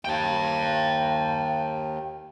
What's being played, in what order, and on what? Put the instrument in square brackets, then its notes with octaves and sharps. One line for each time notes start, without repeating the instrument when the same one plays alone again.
[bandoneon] D#2 [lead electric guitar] G5 A5